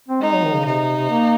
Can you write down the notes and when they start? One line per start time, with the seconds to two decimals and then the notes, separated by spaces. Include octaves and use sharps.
0.08 C4
0.22 G#3 D#4
0.34 F#3
0.44 D#3
0.55 C#3
0.66 C3 D#4
0.80 C3
0.95 C3
1.10 A#3